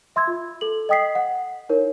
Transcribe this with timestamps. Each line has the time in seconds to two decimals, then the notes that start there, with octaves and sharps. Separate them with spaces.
0.16 E5 C6 E6 G#6
0.27 F4
0.61 A4 F#7
0.89 D#5 G5 D#6 B6 C7
1.15 F#5
1.69 D#4 E4 A#4 C#5